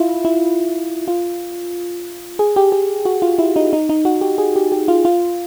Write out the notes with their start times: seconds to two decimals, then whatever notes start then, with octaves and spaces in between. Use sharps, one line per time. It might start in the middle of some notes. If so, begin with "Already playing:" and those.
Already playing: E4 F4
0.25 E4
1.08 F4
2.39 G#4
2.56 G4
2.72 G4
3.05 F#4
3.22 F4
3.39 E4
3.56 D#4
3.73 D#4
3.89 D#4
4.05 F#4
4.21 G4
4.38 G#4
4.56 G4
4.72 G4
4.88 F4
5.05 F4